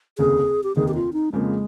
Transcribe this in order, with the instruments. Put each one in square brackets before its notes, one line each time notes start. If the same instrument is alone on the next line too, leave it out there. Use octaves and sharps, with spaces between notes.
[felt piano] F1 D#2 C#3 [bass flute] G#4
[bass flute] G4
[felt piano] F1 D#2 D#3 [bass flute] G#4
[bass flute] G4
F4
D#4
[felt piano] F2 C#3 F3 A#3 [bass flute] G#3